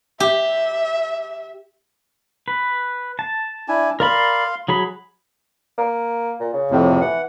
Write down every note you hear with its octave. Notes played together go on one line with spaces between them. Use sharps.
G4 E5
B4
A5
D4 E4 G#5
A#4 D5 F5 B5 C6
F#3 G#4 B5
A#3
A#2
C#3
F2 A2 C3
E3 F#5